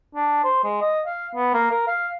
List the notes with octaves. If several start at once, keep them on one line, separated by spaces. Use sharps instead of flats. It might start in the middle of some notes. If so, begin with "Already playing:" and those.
D4
C5
G#3
D#5
F5
B3
A#3
A#4
F5